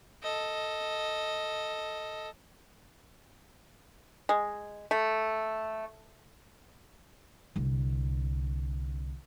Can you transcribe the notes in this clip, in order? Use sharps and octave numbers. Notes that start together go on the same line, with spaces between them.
A4 D#5
G#3
A3
C2 D3